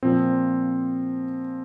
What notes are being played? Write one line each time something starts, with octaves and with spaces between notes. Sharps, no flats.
A#2 F3 C4